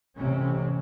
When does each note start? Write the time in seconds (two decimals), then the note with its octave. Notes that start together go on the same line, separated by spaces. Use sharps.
0.17 A1 C3 C4 C#4